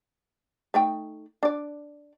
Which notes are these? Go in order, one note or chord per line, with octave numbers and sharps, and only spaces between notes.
A3 D#4 G5
D4 D5